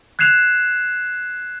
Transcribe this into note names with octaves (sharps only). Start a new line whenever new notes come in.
F#6 G#6 C7 E7 F7